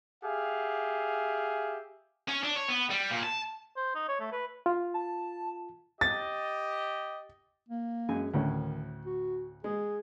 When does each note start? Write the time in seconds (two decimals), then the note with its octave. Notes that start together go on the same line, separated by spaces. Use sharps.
0.23 G4 G#4 E5 F5
2.28 C#4
2.43 D4
2.56 C#5
2.69 B3
2.91 G3
3.11 A#2
3.23 A5
3.77 C5
3.95 D#4
4.08 C#5
4.20 A3
4.32 B4
4.66 F4
4.94 A5
6.01 G4 D#5 A6
7.69 A#3
8.09 F#2 G#3 G#5
8.34 D2 A2 D#3 C#4
9.06 F#4
9.64 G#3 G#4